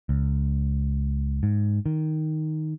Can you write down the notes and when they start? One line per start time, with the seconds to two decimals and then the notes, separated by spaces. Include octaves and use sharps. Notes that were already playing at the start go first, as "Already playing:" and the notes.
0.09 C#2
1.43 G#2
1.86 D#3